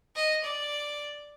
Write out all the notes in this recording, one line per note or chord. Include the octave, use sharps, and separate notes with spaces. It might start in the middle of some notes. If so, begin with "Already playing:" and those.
D#5
D5